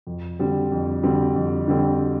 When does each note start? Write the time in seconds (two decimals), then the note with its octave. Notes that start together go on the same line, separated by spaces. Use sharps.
0.07 F2
0.39 D3 G3 C4
0.72 F2
1.03 D3 G3 C4
1.36 F2
1.68 D3 G3 C4